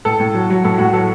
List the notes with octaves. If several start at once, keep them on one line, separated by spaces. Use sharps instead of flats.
A2 A4
A2
F#3
F#3
A2 A4
A2 F#4
F#3 A4